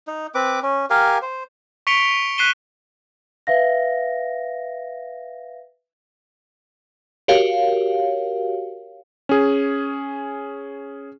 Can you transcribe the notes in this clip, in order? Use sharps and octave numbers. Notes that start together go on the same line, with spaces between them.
D#4
C4 B4 D6
C#4
G4 A#4 F5 G#5
C5
C#6 B6 C#7 D7 F7 G7
F#6 B6 C7 D#7 E7 G7
B4 E5 F5 A#6
F#4 G4 A#4 C#5 F5
C#4 G#4